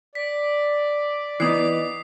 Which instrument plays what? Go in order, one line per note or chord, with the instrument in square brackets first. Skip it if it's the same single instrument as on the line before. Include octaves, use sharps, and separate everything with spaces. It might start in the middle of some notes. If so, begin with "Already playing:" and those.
[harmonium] D5 [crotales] B6
[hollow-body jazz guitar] E3 B3 D#4 [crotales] D#6 C7